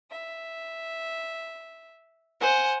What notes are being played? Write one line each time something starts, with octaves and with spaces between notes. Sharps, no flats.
E5
C5 F#5 G#5